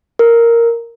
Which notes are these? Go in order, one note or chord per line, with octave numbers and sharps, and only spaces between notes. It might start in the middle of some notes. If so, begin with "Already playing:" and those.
A#4